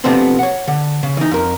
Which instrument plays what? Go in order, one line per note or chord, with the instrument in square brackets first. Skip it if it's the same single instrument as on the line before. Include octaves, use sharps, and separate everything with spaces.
[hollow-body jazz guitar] C3 F3 A3 B3 C4 D4
C#5 F#5
D3
C#3
E3 D#4
F2 A#4